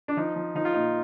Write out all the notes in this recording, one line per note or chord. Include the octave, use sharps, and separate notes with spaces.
D4
F3 D#4
F3
F3 D#4
F4
A#2 D#4